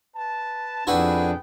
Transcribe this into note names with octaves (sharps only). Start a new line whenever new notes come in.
B4 A5
F2 B3 D4 E4 F#4 G#4 B4 G5